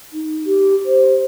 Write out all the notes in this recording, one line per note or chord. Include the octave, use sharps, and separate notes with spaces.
D#4
G4
C5